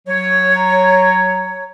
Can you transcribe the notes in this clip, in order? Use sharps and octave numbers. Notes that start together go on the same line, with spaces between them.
F#3 C#5
A#5